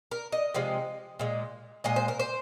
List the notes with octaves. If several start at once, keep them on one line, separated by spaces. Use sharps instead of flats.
A#4
D#5
C3 F3 G#3
A#2 G#3
A#2 G#3 D#5
C5
A#4
C5